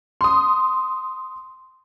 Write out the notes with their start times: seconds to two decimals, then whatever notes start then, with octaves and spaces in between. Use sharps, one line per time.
0.21 C6 D#6